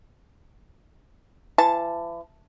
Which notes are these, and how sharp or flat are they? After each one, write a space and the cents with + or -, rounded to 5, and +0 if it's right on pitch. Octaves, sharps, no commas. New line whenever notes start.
E3 +40 A5 +0